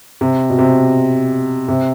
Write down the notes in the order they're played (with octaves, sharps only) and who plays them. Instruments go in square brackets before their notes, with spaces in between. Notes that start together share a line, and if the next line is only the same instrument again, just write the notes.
[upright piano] C3
B2
C3
C3